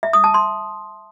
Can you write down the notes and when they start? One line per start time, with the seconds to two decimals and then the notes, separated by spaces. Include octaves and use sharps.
0.03 E5
0.13 D#6
0.24 A5
0.34 C6